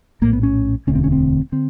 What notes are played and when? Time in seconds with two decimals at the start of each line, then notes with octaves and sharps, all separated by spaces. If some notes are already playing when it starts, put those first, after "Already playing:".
0.21 A#1 A2 A#3
0.33 B3
0.43 C#4
0.87 E1 D2 D3 C#4
0.95 C4
1.04 C#4
1.12 C4
1.52 D3 C4